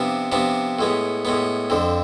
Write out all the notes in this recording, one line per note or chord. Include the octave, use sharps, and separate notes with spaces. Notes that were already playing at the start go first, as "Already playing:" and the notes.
Already playing: C3 F3 B3 D4
C3 F3 B3 D4
A2 G#3 B3
A2 G#3 B3
F2 D3 F3